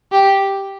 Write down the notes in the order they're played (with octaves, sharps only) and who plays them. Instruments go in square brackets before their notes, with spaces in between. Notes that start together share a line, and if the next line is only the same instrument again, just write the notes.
[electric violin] G4